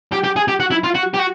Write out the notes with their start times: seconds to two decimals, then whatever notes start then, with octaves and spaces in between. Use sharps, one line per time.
0.12 G4
0.24 G4
0.36 G#4
0.48 G4
0.60 F#4
0.71 E4
0.84 F4
0.94 F#4
1.14 G4
1.19 F#4